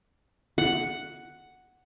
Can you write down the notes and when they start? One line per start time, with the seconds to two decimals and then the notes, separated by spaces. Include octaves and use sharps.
0.58 F#5